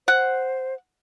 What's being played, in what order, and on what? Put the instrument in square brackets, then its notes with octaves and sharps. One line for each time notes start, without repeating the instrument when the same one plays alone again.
[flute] C5 [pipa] F#5